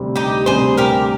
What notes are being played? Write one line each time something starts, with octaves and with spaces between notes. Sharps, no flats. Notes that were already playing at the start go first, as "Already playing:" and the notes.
Already playing: D2 C3 G3 C4
D#4 G4
D2 C3 G3 C4 G#4 C5
G4 A#4